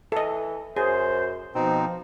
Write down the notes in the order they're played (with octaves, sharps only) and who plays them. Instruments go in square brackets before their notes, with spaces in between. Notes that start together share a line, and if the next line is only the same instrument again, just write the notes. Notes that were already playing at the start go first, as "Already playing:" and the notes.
[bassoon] E3 [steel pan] A4 D#5
[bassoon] F#2 [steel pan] G#4 [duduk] C5
[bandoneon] B2 D#4 [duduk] F3 [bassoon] C4